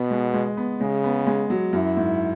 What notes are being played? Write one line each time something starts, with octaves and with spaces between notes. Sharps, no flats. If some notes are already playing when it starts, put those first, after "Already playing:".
Already playing: B2 B3
G#3
G#3
B3
C#3 G#3
B3
G#3
F#3
F#2 E4
G#2